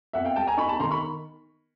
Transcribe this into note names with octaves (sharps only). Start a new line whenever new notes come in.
F2 E5 F#5
F5 G5
G3 G5 A5
G#5 A#5
D#4 B5 C#6
A5 B5
D#3 A#5 C6
B5 C#6